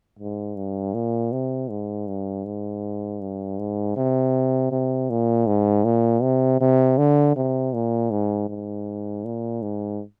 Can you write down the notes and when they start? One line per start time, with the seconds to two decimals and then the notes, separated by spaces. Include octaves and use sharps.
0.19 G#2
0.56 G2
0.94 A#2
1.32 C3
1.70 G#2
2.07 G2
2.45 G#2
3.21 G2
3.59 G#2
3.96 C3
4.71 C3
5.10 A#2
5.47 G#2
5.84 A#2
6.22 C3
6.61 C3
6.98 D3
7.36 C3
7.73 A#2
8.11 G#2
8.49 G#2
9.25 A#2
9.62 G#2